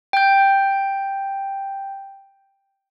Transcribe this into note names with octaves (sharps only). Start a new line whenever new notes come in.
G5 G6